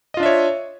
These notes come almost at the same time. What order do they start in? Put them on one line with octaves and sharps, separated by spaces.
D#5 F4 D4 E5 C#5